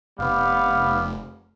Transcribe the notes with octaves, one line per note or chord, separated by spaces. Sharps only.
F1 G3 B3 F5